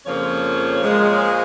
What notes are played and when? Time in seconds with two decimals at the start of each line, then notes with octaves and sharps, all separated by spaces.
0.06 F2 C#3 F3 A#3 C#5
0.82 A#2 F3 G#3
1.10 C#5
1.20 C5